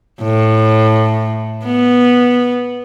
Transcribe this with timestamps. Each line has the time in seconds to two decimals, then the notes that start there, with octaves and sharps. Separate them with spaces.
0.22 A2
1.65 B3